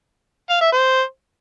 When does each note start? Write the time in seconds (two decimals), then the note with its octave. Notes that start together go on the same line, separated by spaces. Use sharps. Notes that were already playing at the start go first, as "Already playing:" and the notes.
0.50 F5
0.61 E5
0.72 C5